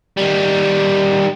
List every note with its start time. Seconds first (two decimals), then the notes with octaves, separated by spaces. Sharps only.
0.17 D#3 G3